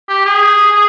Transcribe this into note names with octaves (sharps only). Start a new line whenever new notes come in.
G4
G#4